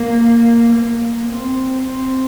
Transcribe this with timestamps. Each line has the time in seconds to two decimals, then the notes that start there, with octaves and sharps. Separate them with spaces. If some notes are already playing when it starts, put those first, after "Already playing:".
Already playing: A#3
0.72 A#3
1.27 C4
1.82 C4